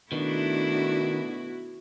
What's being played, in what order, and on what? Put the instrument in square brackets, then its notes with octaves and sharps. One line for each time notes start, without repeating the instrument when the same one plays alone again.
[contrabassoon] B2 [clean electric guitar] D#3 [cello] A3 D4 [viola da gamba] E4 F#4